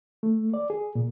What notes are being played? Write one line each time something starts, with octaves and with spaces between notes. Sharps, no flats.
A3
D5
G#4
A#2